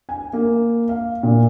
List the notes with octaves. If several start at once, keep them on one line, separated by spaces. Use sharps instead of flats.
G#5
A#3
F5
A#2